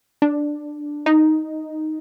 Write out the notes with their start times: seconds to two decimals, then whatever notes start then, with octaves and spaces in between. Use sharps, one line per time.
0.22 D4
1.06 D#4